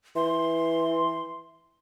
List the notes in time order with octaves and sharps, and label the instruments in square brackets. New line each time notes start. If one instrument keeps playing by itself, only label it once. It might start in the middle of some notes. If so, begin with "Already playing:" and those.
[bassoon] E3 [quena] C6